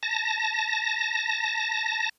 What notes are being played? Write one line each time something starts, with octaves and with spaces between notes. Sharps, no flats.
A5 A#6